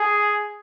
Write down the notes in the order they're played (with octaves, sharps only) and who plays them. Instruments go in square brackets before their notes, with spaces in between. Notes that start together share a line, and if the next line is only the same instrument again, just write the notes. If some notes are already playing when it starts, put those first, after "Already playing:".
Already playing: [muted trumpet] G#4